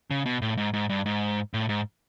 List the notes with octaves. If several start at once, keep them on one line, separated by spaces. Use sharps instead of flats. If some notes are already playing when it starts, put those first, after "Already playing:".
C#3
B2
A2
G#2
G#2
G2
G#2
A2
G#2